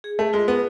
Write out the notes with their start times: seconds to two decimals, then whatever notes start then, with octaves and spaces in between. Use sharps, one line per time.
0.04 G#4
0.19 A3
0.33 G#3 F4
0.48 B3